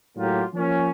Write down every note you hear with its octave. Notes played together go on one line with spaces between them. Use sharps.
A2 F#3 A#3 F4 G4
F3 A#3 C#4